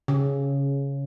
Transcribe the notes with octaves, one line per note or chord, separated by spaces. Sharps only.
C#3